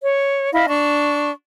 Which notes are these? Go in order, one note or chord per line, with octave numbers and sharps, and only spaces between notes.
C#5
E4 D#5 F5
D4 C#6